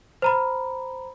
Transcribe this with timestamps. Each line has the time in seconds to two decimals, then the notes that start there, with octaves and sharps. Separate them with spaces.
0.22 C5 A#5 B5